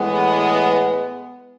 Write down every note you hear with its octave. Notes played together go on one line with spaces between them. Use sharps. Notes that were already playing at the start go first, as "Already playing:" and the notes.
Already playing: A2 E3 G#3 B3